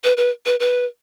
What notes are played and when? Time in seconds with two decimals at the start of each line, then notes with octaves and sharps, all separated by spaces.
0.04 B4
0.17 B4
0.46 B4
0.60 B4